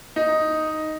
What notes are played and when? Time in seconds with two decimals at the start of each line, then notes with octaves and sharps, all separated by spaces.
0.16 D#4